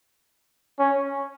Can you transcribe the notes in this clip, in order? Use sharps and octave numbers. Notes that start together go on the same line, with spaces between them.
C#4